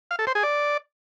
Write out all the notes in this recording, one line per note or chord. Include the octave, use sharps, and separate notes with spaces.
F5
A4
C5
G#4
D5